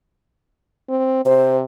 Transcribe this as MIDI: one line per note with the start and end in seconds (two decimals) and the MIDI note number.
0.89 1.21 60
1.26 1.63 48
1.26 1.56 72